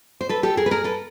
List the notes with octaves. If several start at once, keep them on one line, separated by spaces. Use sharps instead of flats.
C5
A4 B4
G4 A4
G#4 A#4
B4
G#4 A#4
A4 B4